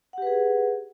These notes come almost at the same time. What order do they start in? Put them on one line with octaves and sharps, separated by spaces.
F#5 G4 B4 G#4